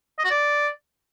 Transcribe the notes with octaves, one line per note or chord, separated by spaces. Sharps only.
D#5
F#4
D5